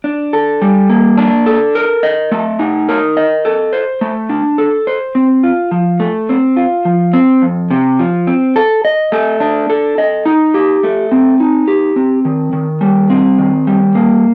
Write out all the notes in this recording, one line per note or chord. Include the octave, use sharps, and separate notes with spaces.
D4
A4
G3
A#3
D4
A4
A#4
D#5
A3
D#4
A#4
D#5
A4
C5
A3
D4
A4
C5
C4
F4
F3
A3
C4
F4
F3
C4
F2
C3
F3
C4
A4
D#5
A3
D4
A4
D#5
D#4
G4
A3
C4
D#4
G4
C4
D#3
D#3
G3
C4
D#3
G3
A#3